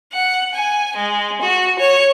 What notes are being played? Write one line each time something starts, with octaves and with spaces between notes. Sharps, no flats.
F#5
G#5
G#3
F#4
C#5